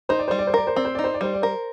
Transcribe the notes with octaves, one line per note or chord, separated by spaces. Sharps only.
D#4 C5
D5
G3 C5
D5
C5
A#4 D5
C5
C4 D5
C5
D#4 D5
C5
D5
G3 C5
D5
A#4 C5